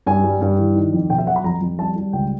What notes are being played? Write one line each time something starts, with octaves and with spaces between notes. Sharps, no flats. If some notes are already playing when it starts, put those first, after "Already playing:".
G2 G#5
G3
G2
E3
D#3
F2
B2 G5
E5
F#3 F#5
B5
F2 A#5
F2
G3 A5
G3
C#2 G5